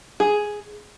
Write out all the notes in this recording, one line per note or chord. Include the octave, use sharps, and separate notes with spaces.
G#4